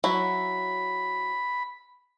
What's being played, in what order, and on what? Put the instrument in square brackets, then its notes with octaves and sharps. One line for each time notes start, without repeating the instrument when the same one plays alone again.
[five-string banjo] F#3 E4 [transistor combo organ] B5